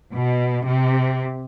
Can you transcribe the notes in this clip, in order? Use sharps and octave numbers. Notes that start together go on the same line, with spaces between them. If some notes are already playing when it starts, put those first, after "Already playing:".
B2
C3